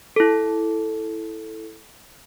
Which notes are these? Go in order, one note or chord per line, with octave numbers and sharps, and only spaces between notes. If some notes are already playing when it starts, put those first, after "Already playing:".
E4 A4